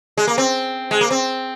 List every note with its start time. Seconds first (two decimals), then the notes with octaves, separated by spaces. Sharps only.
0.17 G#3
0.27 A#3
0.38 C4
0.91 G#3
1.01 A#3
1.11 C4